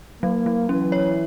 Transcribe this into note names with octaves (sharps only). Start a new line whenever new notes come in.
F#3 A#3
F#3
E3 C#4
C#5